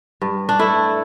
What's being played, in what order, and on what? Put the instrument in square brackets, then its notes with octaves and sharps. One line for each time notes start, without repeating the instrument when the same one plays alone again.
[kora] G2
D4
A3 E4